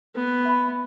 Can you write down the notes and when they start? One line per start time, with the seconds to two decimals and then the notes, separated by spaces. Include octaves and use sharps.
0.15 B3 B4
0.45 E5 B5